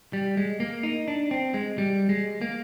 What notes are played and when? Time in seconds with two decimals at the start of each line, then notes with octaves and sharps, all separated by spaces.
0.13 G3
0.37 G#3
0.60 A#3
0.83 D#4
1.08 D4
1.31 C4
1.54 G#3
1.78 G3
2.09 G#3
2.41 A#3